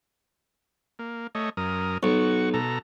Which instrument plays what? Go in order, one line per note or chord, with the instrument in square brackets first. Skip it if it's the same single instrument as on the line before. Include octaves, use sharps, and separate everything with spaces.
[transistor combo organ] A#3
A3 C#5 D#5
F#2 A#4 D#6
[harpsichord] B1 [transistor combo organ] F#4 C#6
[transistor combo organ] B2 A4 A#5